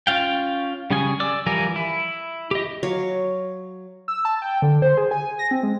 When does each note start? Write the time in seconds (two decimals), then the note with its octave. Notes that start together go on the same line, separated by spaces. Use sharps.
0.07 C#4 F4 F5 G5
0.91 C#3 G3 C#4 G#4 G#5
1.20 D5 D6 E6
1.46 E3 F3 G3 A#4 G#5
1.76 E4
2.51 G4 D#5
2.83 F#3 C#5 F5 C#6
4.08 E6
4.25 A5
4.42 G5
4.62 D3
4.82 C5
4.97 G#4
5.11 G#5
5.39 A#6
5.51 C4
5.63 G#3